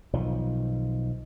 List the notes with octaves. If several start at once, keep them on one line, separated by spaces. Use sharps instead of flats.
B1 D#3 F3